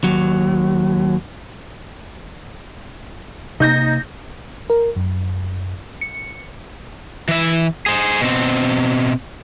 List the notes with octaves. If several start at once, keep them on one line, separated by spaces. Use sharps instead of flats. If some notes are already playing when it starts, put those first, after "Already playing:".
D#2 F#3
C3 A#3 D#4 G6 A#6
A#4
F#2
C#7
E3 E5
G#4 C5
B2 C4